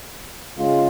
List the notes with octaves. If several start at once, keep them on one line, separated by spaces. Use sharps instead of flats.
C#3 G#3 C#4 F4